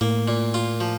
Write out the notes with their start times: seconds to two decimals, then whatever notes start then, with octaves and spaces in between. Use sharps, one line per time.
0.01 A2 A#3
0.28 A#2
0.54 F4
0.80 F3